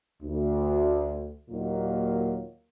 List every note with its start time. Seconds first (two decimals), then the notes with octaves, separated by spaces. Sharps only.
0.23 D2
1.50 D#2 A#2 D#3 F#3 A#3